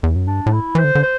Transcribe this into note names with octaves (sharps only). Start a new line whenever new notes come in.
E2
F#2
G2 D4
A2
E4
E3 C5
D3
D3
C5